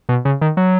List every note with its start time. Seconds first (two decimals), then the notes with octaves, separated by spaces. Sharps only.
0.09 B2
0.25 C#3
0.42 D#3
0.57 F#3